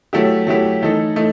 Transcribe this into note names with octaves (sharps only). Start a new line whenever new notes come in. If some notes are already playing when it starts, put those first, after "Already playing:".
F#3 A3 E4 G4
F#3 A3 E4 G4
E3 A3 D#4 A4
E3 A3 D#4